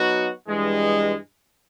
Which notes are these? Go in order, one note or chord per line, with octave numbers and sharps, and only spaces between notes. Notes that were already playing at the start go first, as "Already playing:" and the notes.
Already playing: F#3 B3 D#4 F#4
G2 E3 G#3